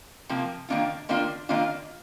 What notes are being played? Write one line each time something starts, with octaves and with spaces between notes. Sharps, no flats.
C3 F3 A#3
D#3 A#3 D4 F4
D#3 A#3 D4 F4
D#3 A#3 D4 F4